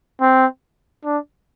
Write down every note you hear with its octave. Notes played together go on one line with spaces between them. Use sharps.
C4
D4